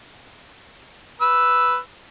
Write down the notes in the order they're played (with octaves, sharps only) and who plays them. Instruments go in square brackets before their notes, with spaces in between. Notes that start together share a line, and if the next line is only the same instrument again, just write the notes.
[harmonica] B4 E6